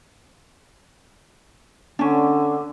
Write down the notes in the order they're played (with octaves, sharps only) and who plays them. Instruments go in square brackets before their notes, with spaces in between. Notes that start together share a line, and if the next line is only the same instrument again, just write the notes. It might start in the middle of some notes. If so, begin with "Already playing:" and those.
[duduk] D3 [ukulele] C#4 D4